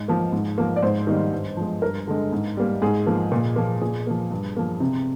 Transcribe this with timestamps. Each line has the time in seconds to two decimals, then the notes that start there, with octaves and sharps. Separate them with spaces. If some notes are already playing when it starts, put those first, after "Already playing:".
Already playing: G#2
0.08 F3 A#3
0.32 G#2
0.58 F3 A#3
0.76 D5
0.82 G#2 C5
1.07 D#3 G3 A#3
1.32 G2
1.57 F3 G#3
1.82 G2 A#4
2.08 D3 G#3
2.33 G#2
2.57 G3 A#3
2.82 G#2 G#4
3.06 F3 A#3
3.32 A#2
3.56 F3 A#3
3.81 A#2 G#4
4.07 F3 A#3
4.31 G2
4.57 F3 A#3
4.80 C3